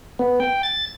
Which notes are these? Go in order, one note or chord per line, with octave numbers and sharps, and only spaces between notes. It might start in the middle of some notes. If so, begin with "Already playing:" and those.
B3
G5
A6